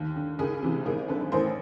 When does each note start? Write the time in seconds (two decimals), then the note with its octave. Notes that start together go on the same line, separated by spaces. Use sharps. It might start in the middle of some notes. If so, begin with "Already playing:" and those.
Already playing: D#2
0.16 D3
0.39 C#2 G#4 A#4
0.63 C3 E3
0.85 G#1 G#4 A#4
1.08 F#2 D3 A4 B4
1.32 A1 A#4 C5